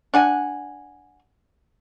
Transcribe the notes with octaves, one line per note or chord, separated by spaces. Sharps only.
D4 F#5 G#5